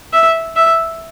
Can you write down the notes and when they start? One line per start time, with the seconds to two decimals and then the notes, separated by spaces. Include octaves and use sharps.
0.13 E5
0.56 E5